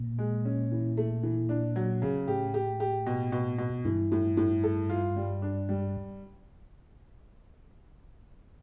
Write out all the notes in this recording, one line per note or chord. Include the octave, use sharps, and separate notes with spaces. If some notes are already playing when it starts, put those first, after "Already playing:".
Already playing: A#2
G#3
C#4
E3
A3
E3
D4
F#3
C#3
A2 G4
G4
G4
B2
B2
B2
G2 E3
A2
A2
A4
F4
G3
D4
G3